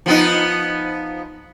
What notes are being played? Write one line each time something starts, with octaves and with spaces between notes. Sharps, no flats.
F3 B3 D#4